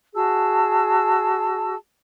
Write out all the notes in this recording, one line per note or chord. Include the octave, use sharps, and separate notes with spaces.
F#4 G#4 A5 E6